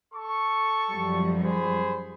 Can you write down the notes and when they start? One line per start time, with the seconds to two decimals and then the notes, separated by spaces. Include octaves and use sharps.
0.14 A4 C#6
0.91 F#2 F3 G3
1.44 G#4 C5 B5